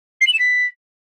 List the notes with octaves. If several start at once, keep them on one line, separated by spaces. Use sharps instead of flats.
C7
F#7
E7
B6